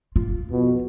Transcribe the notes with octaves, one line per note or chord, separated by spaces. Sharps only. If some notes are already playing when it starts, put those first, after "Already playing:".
F4
F2 B2